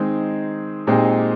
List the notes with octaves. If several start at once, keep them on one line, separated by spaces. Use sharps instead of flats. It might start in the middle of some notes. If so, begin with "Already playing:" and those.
Already playing: D#3 G#3 C4 D#4
A#2 G#3 C4 D#4 G4